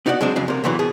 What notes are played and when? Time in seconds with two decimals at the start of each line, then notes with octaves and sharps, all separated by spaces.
0.06 B3 D#4 F#4 D5 F#5
0.21 F#3 G#3 C4 D4
0.36 F2 C#3 F#3 G#3
0.48 C3 A#3
0.64 E2 A#2 E3 F#3 E4
0.79 B2 G#4